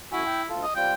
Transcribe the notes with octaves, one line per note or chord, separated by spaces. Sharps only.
F#2 E4 F#4 G#5
G5
D2 F4 A4
D#5
G3 C4 F4 G5